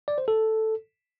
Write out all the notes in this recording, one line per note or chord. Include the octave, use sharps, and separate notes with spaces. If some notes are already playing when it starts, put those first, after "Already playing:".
D5
C5
A4